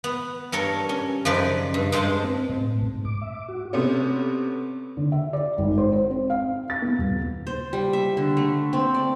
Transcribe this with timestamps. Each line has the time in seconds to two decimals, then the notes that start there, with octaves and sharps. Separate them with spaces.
0.04 B3
0.52 G2 A4 A#4 C#5
0.89 C#4
1.25 F#2 C#3 F3 D#4 B4 D5
1.74 G2
1.92 G2 G#3 F4 C5 A5
2.24 C4
2.49 A2
2.82 G#2
3.05 D6
3.21 E5
3.35 D6
3.48 F#4
3.73 C3 A3 B3 C#4
4.97 D3
5.12 E5
5.33 D5
5.58 G#1
5.78 C5
5.93 C5
6.10 C4
6.30 F5
6.70 A6
6.82 B3
6.98 D#1
7.47 C5
7.73 G3
7.93 E5
8.17 D3
8.37 A3
8.73 C4
8.94 D5